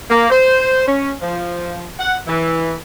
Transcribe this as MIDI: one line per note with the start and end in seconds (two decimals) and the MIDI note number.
0.10 0.27 58
0.30 0.87 72
0.87 1.12 61
1.22 1.84 53
1.99 2.18 78
2.28 2.76 52